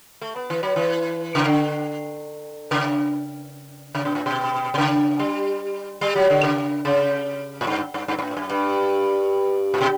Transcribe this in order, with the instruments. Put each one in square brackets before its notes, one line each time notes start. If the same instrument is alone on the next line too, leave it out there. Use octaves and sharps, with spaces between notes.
[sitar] A3
B3
E3
F#3
E3
C#3
D3
C#3
C#3
B2
A2
B2
B2
C#3
G3
G3
F#3
D3
C#3
C#3
A2
G2
G2
G2
G2
A2
F#2
G2
A2
B2